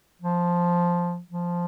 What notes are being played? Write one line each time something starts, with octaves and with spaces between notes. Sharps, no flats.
F3
F3